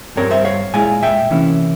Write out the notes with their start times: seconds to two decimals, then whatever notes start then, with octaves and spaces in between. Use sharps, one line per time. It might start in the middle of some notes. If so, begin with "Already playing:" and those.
0.16 G2 G3 C4 A#4 C#5
0.31 C5 E5
0.45 C#5 F5
0.74 A#2 G#3 E4 F5 G#5
1.03 E5 G5
1.31 C3 E3 A#3 C#4 E4